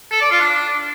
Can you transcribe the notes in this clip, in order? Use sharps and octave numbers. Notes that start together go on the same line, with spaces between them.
A4
D5
F4
D4